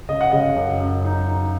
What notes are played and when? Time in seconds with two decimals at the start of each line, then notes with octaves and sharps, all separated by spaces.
0.09 C#3 D#5
0.21 F#5
0.32 C#3 D#5
0.56 F#2
0.80 F#2
1.05 D#4
1.28 D#4